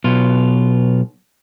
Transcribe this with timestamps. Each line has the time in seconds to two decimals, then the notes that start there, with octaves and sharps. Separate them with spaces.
0.04 B1 B2 F4